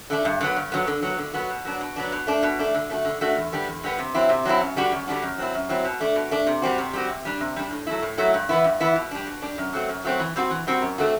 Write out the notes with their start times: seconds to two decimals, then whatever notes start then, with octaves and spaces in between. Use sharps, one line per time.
0.10 D3 A3 D4
0.25 G2
0.41 D3 F#3 B3
0.56 G2
0.72 D3 F#3 B3
0.87 D3
1.03 F#3 B3 F#4
1.19 D3
1.34 F#3 B3 F#4
1.50 B2
1.65 F#3 B3 D4
1.81 B2
1.96 F#3 B3 D4
2.12 B2
2.27 A3 D4
2.43 B2
2.59 A3 D4
2.74 D3
2.90 A3 D4 F#4
3.05 D3
3.21 A3 D4 F#4
3.36 E2
3.52 D3 G3 B3
3.67 E2
3.83 D3 G3 B3
3.99 C3
4.14 F#3 C4 E4
4.29 C3
4.45 F#3 C4 E4
4.61 F#2
4.76 D3 G3 D4 F#4
4.92 F#2
5.07 D3 G3 D4 F#4
5.22 F#2
5.38 F#3 C4 E4
5.54 F#2
5.69 F#3 C4 E4
5.85 B2
6.00 A3 D4
6.16 B2
6.31 A3 D4
6.47 C3
6.62 G3 C4 F#4
6.78 C3
6.93 G3 C4 F#4
7.09 C3
7.25 G3 D4
7.40 C3
7.56 G3 D4
7.71 A2
7.87 F#3 A3 E4
8.02 A2
8.17 F#3 A3 E4
8.34 G2
8.49 E3 B3 E4
8.64 G2
8.80 E3 B3 E4
8.96 B2
9.11 G3 D4
9.27 B2
9.42 G3 D4
9.58 F#2
9.73 F#3 A3 C4 F#4
9.89 F#2
10.05 F#3 A3 C4 F#4
10.20 E3
10.36 G3 C4 F#4
10.50 E3
10.67 G3 C4 F#4
10.82 F#2
10.98 D3 A3 C4 F#4